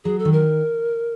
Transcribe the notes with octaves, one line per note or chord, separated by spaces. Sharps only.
F#3 G#4
A4
D#3
A#4